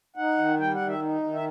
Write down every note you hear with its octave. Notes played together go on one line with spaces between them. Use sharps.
D#4 F#5
D#3
G3 G5
F#5
D#3
E5
D#4
D#3
E5